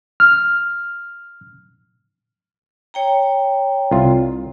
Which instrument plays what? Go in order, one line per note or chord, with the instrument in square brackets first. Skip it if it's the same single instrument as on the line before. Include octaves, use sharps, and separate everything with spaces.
[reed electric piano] F6
[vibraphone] C#5 G5 A#5
[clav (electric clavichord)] C2 F4